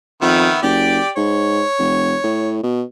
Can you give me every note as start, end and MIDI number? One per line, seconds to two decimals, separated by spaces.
0.22 0.49 41
0.22 0.58 51
0.22 0.58 59
0.22 0.58 76
0.62 1.00 30
0.62 1.09 67
0.62 1.09 74
1.17 1.63 44
1.17 2.55 73
1.79 2.15 29
2.24 2.62 45
2.63 2.83 47